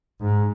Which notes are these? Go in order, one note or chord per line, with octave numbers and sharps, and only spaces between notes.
G#2